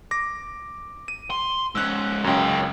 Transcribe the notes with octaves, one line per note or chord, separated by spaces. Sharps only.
D6 A#6
D#7
C6
G#2 C#4 E6 F#6
C#2 F#2 C#4 G5